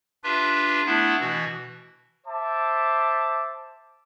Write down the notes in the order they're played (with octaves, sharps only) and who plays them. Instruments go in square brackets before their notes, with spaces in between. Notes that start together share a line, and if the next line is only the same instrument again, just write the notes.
[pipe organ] D4 F4 G4 B4 E5
A3 B3 D4 E4
B2 E3 F#4
[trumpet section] C5 E5 A5 D6